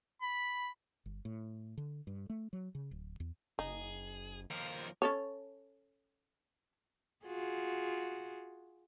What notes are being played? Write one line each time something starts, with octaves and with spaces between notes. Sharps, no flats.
B5
G1
A2
D3
G2
A3
F#3
C#3
D1
E2
F#1 D#4 G#4
D#2 F3 A#4
C#4 A4 C#5
F4 F#4 G#4